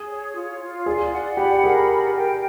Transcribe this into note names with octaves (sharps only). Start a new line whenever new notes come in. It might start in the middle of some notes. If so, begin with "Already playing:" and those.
Already playing: G#4
C#5
F4
F4
G#4 D5
F#5
G4 B5
G#4 A#4
D5
G5